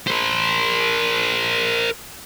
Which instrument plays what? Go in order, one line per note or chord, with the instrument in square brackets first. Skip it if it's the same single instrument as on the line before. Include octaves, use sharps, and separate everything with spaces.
[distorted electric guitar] A#4 C5